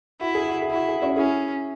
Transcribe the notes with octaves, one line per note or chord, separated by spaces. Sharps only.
E4 F#4
G#4
F#4
G#4
E4
F#4
G#4
C#4 F#4
C#4 E4 G#4